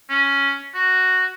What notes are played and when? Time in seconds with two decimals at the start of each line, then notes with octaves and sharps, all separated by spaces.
0.10 C#4
0.74 F#4